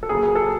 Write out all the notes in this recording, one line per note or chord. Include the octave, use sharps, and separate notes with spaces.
A4
C#3 F#3 A#3 G#4
G#4
A4